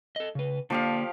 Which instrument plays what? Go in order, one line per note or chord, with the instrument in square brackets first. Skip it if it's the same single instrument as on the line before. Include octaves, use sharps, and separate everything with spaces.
[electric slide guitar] A4 D#5
C#3 B4
[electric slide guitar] D3 A#3 D4 [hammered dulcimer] F3 G4 F5